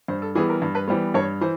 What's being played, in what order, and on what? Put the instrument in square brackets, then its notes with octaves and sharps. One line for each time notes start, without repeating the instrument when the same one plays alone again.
[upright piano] G2 [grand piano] C5
[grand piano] A4
[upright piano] E3 G3 B3 [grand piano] G#4
[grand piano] A#4
[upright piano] G2
[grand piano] B4
[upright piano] E3 G3 B3 [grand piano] C5
[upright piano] G2 [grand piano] C#5
[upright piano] E3 [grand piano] C5